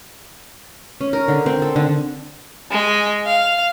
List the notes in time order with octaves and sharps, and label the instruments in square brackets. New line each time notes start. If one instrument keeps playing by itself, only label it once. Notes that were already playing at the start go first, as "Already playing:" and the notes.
[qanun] C#4
A#4
D3
C4
A4
D3
[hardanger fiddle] G#3
F5